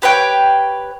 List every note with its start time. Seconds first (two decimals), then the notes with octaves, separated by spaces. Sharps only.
0.02 G4 B4 C#5 G5